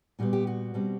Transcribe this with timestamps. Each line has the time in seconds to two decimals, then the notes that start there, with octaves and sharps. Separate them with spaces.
0.19 A#2 G3 B3 F#4
0.33 G4
0.47 F#4
0.74 B2 G3 C4